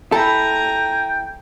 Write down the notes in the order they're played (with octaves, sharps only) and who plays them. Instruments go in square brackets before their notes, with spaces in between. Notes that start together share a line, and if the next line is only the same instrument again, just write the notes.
[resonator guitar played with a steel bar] E4 [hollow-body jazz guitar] A4 [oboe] G5 [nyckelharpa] G#5 A#5